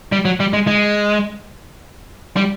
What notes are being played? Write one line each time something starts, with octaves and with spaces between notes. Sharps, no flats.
G3
F#3
G3
G#3
G#3
G3